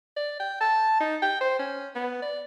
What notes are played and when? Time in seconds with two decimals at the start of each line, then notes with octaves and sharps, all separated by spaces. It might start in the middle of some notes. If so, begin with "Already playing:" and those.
0.16 D5
0.39 G5
0.61 A5
1.00 D#4
1.22 G5
1.41 C5
1.59 C#4
1.95 B3
2.22 D5